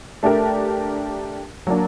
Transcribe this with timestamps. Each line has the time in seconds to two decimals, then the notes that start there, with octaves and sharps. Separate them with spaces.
0.23 A3 D4 G4 A#4
1.67 F#3 A#3 D4